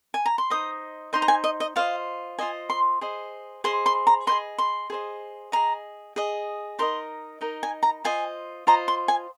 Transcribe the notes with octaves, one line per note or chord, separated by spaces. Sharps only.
G#5
A#5
C6
D#4 C5 D#5 D#6
D#4 C5 D#5 C6
A#5
G#5
D#5
D#5
F4 C5 D#5 F5
F4 C5 D#5 G#5
C6
G#4 C5 D#5
G#4 C5 D#5 C6
C6
A#5
G#4 C5 D#5 C6
C6
G#4 C5 D#5
G#4 D#5 A#5
G#4 D#5
D#4 A#4 D#5 C6
D#4 A#4 D#5
G#5
A#5
F4 C5 D#5 G#5
F4 C5 D#5 A#5
C6
G#5